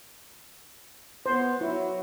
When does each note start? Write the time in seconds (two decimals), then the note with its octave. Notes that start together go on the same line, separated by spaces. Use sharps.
1.26 B3 C5
1.61 F#3 E4